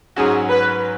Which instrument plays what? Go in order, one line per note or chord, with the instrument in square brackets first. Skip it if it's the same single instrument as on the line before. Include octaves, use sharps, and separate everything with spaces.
[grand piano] G#2 F#3 C#4 F#4 [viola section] G#4
[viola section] B4